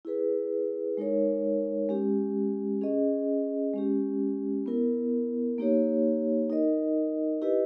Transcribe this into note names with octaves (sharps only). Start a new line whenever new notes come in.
E4 G#4 B4
G#3 D#4 A#4 C#5
G#3 C#4 G4
C#4 G#4 D#5
G#3 C#4 G4
B3 E4 A#4
A#3 D#4 G4 C#5
D#4 A#4 D#5
E4 G4 B4 D#5